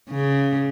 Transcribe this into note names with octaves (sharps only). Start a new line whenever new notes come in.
C#3